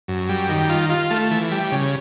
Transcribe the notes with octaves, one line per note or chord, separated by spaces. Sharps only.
F#2
G3
D#3
F4
F4
A3
E3
G3
C#3